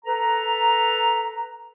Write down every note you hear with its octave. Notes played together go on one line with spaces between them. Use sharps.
A4 B4 A#5